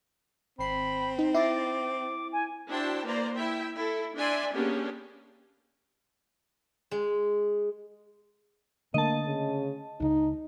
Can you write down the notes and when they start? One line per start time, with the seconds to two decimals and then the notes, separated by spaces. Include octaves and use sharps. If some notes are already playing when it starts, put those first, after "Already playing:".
0.59 G#1 C4 B5 C7
1.19 D#4
1.35 E4 D6 A6 A#6 C7
2.32 G#5
2.71 D4 E4 F#4 C5 G5 A5
3.05 A#3 B4 C5 D5 A#5
3.36 E4 E5 G5
3.78 E4 A4
4.17 D4 D5 E5 G#5 C6
4.53 A#3 B3 C#4 D4 G4 G#4
6.91 G#3
8.94 D3 A3 A#3 D4 D#5 A5
9.25 C#3
10.00 C#2 C#3 D#4